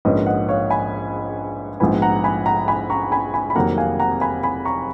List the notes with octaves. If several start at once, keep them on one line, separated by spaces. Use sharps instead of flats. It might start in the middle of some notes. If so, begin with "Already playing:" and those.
A#1 G#2 F3 A#3 C#4 B4 D#5
D#5 F#5
C#5 F5
G#5 B5
A#1 G#2 F3 B3 G#5 B5
F#5 A#5
G#5 B5
F#5 A#5
G#5 B5
A#5 C#6
G#5 B5
G#5 B5
B5
F1 F2 D#3 F#3 A#3 F#5 A#5
F5 G#5
F#5 A#5
G#5 B5
G#5 B5
A#5 C#6